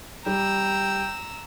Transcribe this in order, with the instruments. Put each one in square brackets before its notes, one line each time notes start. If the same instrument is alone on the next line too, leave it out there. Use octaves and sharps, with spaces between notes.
[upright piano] G3 [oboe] G5 [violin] A#5 E6